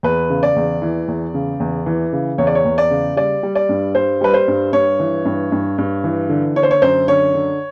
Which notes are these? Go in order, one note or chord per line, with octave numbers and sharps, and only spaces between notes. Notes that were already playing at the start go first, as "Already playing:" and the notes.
E2 B4
C#3
D5
E2
E3
E2
C#3
E2
E3
C#3
E2 C#5
D5
C#5
E2
D5
C#3
G3 D5
G3
D5
G2
G3 C5
G3 B4
C5
G2
G2 C#5
E3
G2
G2
G2
E3
D3
D3 C#5
C5
C#5
F#2 C5
D3 C#5
D3